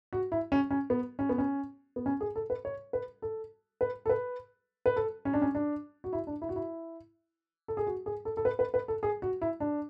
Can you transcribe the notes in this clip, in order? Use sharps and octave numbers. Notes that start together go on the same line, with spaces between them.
F#4
E4
C#4
C#4
B3
C#4
B3
C#4
B3
C#4
G#4
A4
B4
C#5
B4
A4
B4
A4
B4
B4
A4
C#4
D4
C#4
D4
F#4
E4
D4
E4
F#4
E4
A4
G#4
F#4
G#4
A4
A4
B4
B4
B4
A4
G#4
F#4
E4
D4